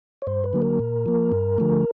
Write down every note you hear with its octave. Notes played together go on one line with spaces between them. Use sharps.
C#5
G2 C5
B4
D3 F#3 A#3
A#4
A#2
F3 A#3
G2
D3 F3 A3